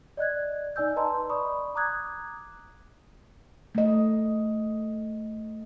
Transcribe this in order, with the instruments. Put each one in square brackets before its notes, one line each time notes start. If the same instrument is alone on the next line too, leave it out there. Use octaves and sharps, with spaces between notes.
[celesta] D5 D#5 F#6 G#6
D#4 D5 G#5 E6 G6
B4 D#5 A5 A#5 C6
D5 B5 C#6 D#6
A#5 D6 D#6 F#6 G#6
[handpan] A3 D#5